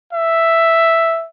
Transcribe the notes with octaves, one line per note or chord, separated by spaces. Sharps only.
E5